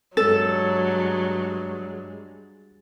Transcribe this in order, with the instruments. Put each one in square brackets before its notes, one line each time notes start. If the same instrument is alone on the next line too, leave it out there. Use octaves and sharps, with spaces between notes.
[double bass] G2 G#3 [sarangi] F#3 [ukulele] A4 [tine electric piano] A6